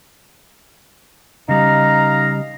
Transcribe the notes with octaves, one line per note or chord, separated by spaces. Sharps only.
C#3 G3 D#4 F5 A#5